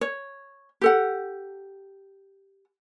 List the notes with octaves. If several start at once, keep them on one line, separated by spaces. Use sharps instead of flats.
C#5
G4 A4 F#5